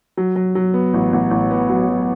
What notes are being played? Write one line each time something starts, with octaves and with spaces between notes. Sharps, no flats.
F#3
F#3
F#3
B3
A1
A1
A1
B3
F#3
F#3